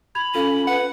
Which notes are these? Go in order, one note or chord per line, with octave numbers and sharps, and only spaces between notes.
B5 G#6 F7
C#4 F4 A4 F5
B4 F#5